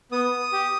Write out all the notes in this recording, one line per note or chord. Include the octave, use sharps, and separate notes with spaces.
B3 D#6
G4